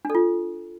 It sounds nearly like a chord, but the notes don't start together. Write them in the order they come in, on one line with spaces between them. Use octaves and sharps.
D4 A4 F4